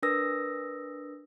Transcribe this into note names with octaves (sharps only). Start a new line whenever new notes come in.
D4 A#4 B4 D#6 E6 A#6